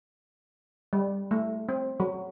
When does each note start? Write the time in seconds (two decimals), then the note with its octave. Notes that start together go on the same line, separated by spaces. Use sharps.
0.93 G3
1.31 A3
1.69 C4
2.00 F#3